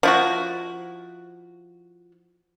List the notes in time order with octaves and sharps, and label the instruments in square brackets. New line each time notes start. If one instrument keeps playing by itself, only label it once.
[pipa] F3 E4 F#4